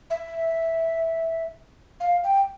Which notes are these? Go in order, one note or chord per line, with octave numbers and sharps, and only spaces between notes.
E5
F5
G5